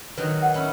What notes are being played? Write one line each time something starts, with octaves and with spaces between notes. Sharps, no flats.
D#3 F#3 B4
F#5
C#4 E4